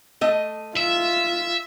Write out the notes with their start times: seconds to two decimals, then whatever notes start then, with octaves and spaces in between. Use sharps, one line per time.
0.21 A3 D#5
0.77 F4 E5